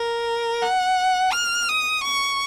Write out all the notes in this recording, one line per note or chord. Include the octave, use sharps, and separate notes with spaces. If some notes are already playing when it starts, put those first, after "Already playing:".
Already playing: A#4
F#5
F6
D#6
C#6